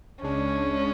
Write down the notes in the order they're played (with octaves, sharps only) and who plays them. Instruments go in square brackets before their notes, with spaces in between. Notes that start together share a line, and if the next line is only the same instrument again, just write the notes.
[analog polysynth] C#2 C#3 G#3 D4 [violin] C#4